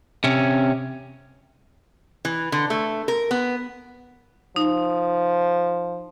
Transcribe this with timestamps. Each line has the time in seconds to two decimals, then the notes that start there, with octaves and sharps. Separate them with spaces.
0.24 C3 C#4
2.25 E3
2.52 D3
2.70 A3
3.08 A#4
3.31 B3
4.56 F3 D#4